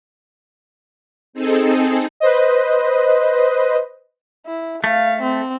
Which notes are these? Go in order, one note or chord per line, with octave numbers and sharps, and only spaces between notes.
C4 D#4 G#4 A4
B4 C5 D#5
E4
A3 F5
C4